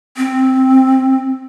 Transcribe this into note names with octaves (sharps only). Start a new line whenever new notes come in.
C4